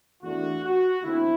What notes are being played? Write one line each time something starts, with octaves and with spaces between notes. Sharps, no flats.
E2 D3 A3 F#4
F#4
E2 D3 A3 C4 E4